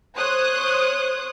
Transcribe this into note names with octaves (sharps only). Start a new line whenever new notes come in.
C5 C#5 D#6 F#6